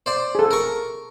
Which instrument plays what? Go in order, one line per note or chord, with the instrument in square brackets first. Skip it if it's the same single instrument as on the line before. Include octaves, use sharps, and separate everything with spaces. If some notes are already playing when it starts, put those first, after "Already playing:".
[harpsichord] C5 D5
[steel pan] G#4 A4
[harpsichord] A#4 C#6